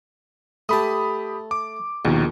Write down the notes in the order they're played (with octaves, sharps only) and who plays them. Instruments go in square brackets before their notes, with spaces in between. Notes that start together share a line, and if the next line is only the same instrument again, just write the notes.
[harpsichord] A3 A5 [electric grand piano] G4 B5 D#6
[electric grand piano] D6
[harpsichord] A#1 [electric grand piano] D#2 B2 D#3